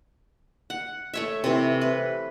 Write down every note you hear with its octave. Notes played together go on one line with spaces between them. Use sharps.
F#5
A3 C#5 E5
C3 E3
B4